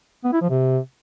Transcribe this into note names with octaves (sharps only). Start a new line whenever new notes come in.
B3
E4
F3
C3